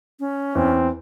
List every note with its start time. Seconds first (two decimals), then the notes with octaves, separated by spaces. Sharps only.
0.20 C#4
0.55 E2 C4